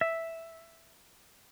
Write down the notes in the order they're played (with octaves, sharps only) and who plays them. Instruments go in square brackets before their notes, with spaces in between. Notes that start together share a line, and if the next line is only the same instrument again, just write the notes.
[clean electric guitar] E5